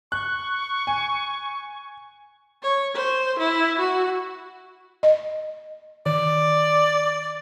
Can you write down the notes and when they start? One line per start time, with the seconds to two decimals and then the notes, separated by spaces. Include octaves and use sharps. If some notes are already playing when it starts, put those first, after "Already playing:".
0.12 C#6 F#6
0.87 G#5
2.63 C#5
2.95 C5
3.39 E4
3.78 F#4
5.03 D#5
6.06 D#3 D5